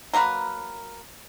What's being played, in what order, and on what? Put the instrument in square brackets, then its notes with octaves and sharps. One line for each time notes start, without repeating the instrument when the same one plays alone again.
[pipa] F#3 A#3 A#4 B4